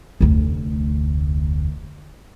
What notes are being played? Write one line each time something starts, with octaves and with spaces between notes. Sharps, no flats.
F1 D2